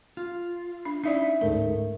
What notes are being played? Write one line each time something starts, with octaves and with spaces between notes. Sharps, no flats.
F4
D4
C#4 D#4 E4 D5 E5
D2 G#2 A3 A#4